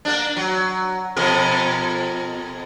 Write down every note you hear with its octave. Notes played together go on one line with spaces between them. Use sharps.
A#3 D4
F#3
F2 B2 A#4